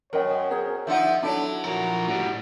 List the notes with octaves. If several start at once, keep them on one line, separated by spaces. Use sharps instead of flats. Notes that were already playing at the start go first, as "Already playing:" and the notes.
F#2 A#4 C#5 D#5 G5
G#4 A#4 C5 C#5
F3 D#4 F4 D5 E5 F#5
F#3 D4 E4 A4
F3 F#4 A#4
A2 G3 F#5